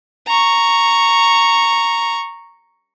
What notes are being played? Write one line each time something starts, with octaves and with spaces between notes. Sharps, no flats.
A#5 C#6